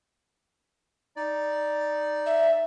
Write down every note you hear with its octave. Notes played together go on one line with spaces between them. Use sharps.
D#4 D5
E5